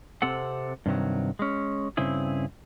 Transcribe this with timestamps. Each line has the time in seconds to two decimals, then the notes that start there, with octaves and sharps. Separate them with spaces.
0.22 C3 C4 A4 F#5
0.86 G2 C3 D#3 F#3
1.39 G#3 C#4
1.97 G2 C#3 C4 E4 G#4